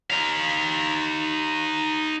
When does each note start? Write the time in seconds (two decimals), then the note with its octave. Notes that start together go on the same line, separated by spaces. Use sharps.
0.10 D#4 F5